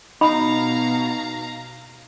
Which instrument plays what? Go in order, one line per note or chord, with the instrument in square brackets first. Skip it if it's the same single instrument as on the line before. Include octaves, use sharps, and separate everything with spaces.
[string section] B2 [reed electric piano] D#4 [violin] F5 A#5 [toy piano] B5